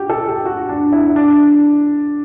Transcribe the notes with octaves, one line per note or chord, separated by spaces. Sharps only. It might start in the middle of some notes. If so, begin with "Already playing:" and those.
Already playing: F#4 G4
A4
G4
F#4
D4
E4
D4